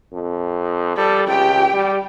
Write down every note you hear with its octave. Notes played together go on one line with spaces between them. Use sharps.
F2
G3 A4
C#2 G4 G5
G3